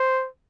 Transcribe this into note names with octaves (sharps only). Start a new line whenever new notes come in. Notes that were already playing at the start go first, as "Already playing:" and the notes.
Already playing: C5